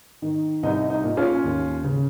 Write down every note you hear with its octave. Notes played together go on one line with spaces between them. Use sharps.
D#3
C2 D#4
D#4
A#2
C#4 F4
D#2
C#3